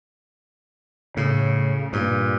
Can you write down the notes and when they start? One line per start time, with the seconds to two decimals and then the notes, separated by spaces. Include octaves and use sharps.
1.17 A2 C#3
1.93 G2 A#2